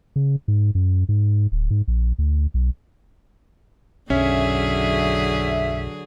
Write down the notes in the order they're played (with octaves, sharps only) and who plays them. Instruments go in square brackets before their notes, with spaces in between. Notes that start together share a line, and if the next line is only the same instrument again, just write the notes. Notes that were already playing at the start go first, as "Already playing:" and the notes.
[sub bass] C#3
G#2
F#2
G#2
D1
G#2
A#1
D2
B1
[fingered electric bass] B1 F#2 [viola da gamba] D3 F#3 G#4 [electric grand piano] C#4 [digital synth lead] E5